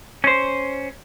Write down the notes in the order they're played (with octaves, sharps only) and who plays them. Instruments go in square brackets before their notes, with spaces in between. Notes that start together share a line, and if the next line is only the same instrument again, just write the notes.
[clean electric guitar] C#4 C5